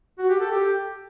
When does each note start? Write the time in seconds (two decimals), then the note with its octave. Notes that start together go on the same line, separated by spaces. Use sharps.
0.18 F#4
0.29 G4
0.40 A4
0.51 G4